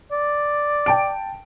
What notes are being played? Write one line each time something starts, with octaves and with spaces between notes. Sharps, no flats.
D5
G5 A5 D7